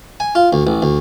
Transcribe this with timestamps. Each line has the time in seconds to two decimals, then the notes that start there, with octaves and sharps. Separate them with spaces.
0.20 G#5
0.35 F4
0.53 D2
0.67 A1
0.82 D2